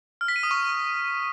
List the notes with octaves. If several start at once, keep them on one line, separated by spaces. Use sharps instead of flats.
F6
B6
D#7
D#6
C#6